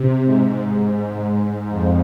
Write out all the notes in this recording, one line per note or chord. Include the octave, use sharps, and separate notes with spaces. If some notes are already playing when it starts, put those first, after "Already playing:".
Already playing: C3
G#2
F2